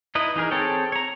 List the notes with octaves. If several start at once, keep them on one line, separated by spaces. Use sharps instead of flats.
D#4 E4 B4 D#5
E3 D#4 G#4 A#4
C4 G#4 A4 C#5 G5
C#5 A#5